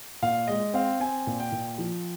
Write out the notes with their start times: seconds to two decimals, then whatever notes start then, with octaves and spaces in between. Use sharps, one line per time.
0.22 A#2 F5
0.48 G#3 D#5
0.74 C4 F5
1.00 C4 G#5
1.27 A#2
1.40 G5
1.52 A#2
1.78 F3